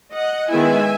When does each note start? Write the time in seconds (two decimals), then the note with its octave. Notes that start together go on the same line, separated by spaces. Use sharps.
0.14 D#5 F#5
0.50 D#3 G#3 B3 E4 E5 G#5